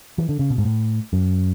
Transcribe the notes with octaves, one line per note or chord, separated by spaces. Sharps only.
E3
D3
C#3
B2
G#2
A2
F#2